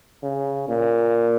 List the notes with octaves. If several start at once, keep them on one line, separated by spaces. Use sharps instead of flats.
C#3
A#2